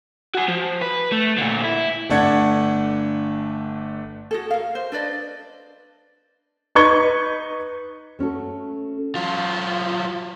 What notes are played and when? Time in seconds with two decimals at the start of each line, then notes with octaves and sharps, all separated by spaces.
0.34 F#4 G#5
0.48 F3
0.82 B4
1.12 A3
1.38 A#2 D3
1.64 E4
2.10 G1 A3 D4 F#5 G#6
4.31 F#4 G#4 A4
4.50 A#4 F5
4.75 C5
4.92 D4 B4 D5 D#5
6.75 D#4 B4 C#6 G#6 G7
8.19 A3 C#4 F#4 A4
9.15 F#3 F4